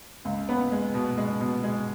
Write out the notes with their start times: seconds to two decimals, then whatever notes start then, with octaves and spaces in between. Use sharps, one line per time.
0.25 C#2
0.49 B3
0.72 G#3
0.94 B2
1.18 G#3
1.41 B2
1.63 G#3